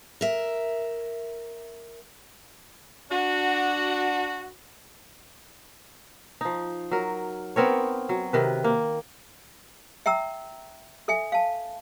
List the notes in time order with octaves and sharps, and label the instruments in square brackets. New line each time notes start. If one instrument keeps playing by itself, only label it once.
[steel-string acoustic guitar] A#4 E5
[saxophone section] D4 F#4
[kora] F3 D#4
F#3 A#4
B3 C4 A#4 C#5
F#3
C3 D#3 B4
A#3
[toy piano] E5 G5 A#5 E6
A4 E5 G#5
F5 A5